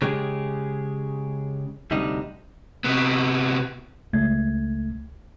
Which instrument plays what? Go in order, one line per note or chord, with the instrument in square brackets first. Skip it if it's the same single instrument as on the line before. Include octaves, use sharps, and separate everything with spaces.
[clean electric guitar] C#3 G#3 G4 G#4
D2 C3 G3 D4 D#4
[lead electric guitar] C3 B3
[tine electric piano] C#2 A3 G#6